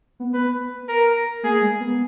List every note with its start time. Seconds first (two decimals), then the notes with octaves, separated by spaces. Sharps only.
0.20 B3
0.34 B3 B4
0.89 A#4
1.43 A#3 G#4
1.61 G#3
1.80 B3